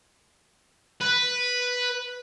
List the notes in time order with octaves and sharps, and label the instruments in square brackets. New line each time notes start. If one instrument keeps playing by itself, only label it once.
[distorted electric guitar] B4